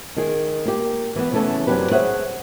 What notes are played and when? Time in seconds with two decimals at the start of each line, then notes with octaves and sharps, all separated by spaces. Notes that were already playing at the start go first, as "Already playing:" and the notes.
0.16 D#3 G#4
0.66 A#3 G4
1.16 E3 B3
1.32 C#3 E3 A3 B3 C#4 A4
1.67 F#2 C3 F#3 D4 G4 B4
1.91 G#4 C5 C#5 E5 F#5